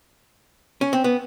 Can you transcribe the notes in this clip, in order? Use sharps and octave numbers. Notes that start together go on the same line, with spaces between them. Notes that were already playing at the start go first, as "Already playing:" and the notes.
C#4
C4
B3